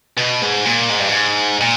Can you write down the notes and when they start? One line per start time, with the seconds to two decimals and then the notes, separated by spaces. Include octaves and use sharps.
0.18 B2
0.42 G#2
0.66 A#2
0.90 G#2
1.00 G2
1.09 G#2
1.61 A#2